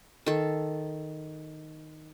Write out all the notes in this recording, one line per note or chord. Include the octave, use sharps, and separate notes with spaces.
D#3 A4